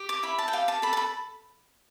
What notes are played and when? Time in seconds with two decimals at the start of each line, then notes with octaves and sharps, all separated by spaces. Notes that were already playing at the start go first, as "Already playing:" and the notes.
Already playing: G4
0.09 D6
0.23 E4 B5
0.38 A5
0.48 G5
0.53 G4 F5
0.68 A5
0.82 A4 B5
0.93 A5
0.97 B5